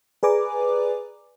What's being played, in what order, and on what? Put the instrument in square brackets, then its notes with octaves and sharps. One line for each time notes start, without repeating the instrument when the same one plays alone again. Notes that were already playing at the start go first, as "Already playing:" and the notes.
[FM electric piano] G#4 B4 D5 G#5 A#5 D6